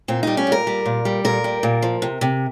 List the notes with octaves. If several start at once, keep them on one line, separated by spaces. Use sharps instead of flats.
A#2 C4
G3 D#4
C#4
A#2
A#4
G3
A#2
G3
A#2 A#4
G3
A#2
F3
C3
C3